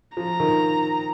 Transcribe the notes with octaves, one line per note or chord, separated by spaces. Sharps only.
F3 A#5
D#3